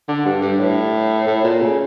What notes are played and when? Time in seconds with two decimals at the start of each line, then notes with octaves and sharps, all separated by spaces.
0.08 D3
0.26 G2
0.42 G2
0.59 A2
1.27 A2
1.44 A#2
1.61 C#3